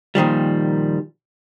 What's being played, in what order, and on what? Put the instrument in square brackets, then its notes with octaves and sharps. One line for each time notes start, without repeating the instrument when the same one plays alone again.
[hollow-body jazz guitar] A#2 D#3 F3 G3